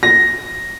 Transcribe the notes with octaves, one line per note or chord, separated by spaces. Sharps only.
A#6